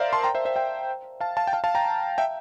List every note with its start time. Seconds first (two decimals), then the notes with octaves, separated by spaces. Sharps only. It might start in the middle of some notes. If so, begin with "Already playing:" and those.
Already playing: A#4 C5 D5 E5 F5
0.13 A5 C6
0.23 G5 A#5
0.35 C5 E5
0.45 C5 E5
0.56 E5 G5
1.21 F5 A5
1.37 F5 A5
1.47 G5
1.53 F5 A5
1.64 F5 A5
1.75 G5 A#5
2.18 E5 G5